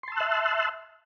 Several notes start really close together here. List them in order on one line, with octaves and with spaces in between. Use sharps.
C6 A5 E6 F#6 E5